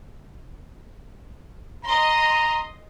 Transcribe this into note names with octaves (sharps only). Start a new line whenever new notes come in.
D#5 A#5 C6